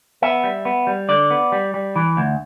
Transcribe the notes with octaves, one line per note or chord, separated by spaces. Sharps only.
B3 E5
G3
B3
G3
D3 D5
B3
G3
G3
E3
D2